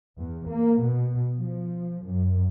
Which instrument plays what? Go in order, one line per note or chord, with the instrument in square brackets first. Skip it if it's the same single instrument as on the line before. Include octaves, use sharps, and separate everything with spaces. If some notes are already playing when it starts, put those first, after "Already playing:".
[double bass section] E2
A#3
B2
F3
F#2